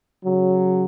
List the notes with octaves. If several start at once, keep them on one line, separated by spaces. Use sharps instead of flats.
C#3 F#3